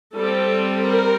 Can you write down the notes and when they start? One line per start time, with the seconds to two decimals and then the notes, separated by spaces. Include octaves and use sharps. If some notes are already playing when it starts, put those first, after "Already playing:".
0.15 G3 C4 A4
0.87 A#4